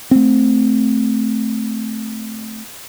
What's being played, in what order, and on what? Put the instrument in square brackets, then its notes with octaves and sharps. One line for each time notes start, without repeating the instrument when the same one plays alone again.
[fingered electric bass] A3 C4